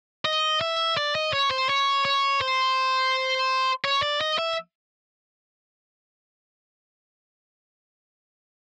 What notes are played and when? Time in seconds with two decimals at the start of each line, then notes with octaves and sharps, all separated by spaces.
0.25 D#5
0.61 E5
0.97 D5
1.15 D#5
1.33 C#5
1.51 C5
1.69 C#5
2.05 C#5
2.41 C5
3.85 C#5
4.03 D5
4.21 D#5
4.38 E5